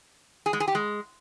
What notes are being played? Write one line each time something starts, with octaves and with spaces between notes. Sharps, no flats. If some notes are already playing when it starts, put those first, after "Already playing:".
G#4
G#3
G#4
G4
G#3